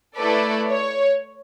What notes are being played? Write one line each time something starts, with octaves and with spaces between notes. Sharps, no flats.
A3 E4 A4 B4 D5
C#5